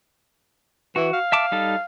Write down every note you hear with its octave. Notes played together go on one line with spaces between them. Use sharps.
E3 F#4
F5
E5 A5 D6
G3 D#4 A4